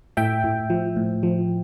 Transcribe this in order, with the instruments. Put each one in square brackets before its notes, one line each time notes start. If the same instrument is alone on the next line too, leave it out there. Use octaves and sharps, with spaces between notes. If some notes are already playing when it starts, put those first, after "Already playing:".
[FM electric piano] A2 E5 G5
A2
F3
A2
F3